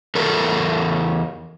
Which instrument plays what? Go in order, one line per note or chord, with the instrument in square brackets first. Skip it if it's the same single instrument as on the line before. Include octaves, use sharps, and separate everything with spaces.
[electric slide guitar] E2 A4 A#4 C#5